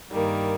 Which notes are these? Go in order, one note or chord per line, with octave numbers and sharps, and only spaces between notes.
G2 D#3 G3 A#3